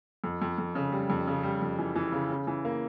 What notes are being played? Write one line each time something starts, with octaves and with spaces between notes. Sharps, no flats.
F2
F2
F2
C#3
G3
F2
C#3
G3
F2
E3
E3
C#3
C#3
E3
A#3